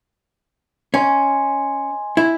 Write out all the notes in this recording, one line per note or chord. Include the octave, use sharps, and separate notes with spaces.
C#4 D#5 G#5 C6
E4